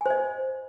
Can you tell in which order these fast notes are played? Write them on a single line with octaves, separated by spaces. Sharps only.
G#5 C5 D#5